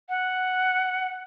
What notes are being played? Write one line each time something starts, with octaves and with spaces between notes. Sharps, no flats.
F#5